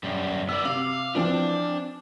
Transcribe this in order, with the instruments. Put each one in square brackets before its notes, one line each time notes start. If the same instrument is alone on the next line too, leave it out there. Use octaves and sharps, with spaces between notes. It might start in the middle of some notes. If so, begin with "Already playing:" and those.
[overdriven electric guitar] F#2 G3
[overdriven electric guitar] B3 D5 [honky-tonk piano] E6
[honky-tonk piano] C3 D6 F#7 [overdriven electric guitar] F5
[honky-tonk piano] E3 F3 C4 [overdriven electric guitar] D4